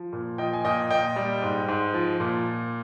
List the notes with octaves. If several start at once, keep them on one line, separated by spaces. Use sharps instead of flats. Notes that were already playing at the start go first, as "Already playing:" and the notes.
Already playing: F3
A#2
F3 D#5 G5
G#5
A#2 D#5 G5
A#2 D#5 G5
G3
G#2
G#2
F3
A#2